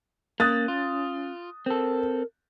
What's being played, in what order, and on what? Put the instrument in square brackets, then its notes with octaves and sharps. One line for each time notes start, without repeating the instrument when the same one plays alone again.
[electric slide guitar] A#3 [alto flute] C#4 [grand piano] D#6 F#6 A6
[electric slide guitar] F4
[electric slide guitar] C4 A4 [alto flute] A#4